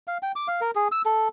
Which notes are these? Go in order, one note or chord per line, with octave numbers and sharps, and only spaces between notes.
F5
G5
D6
F5
A#4
G#4
E6
A4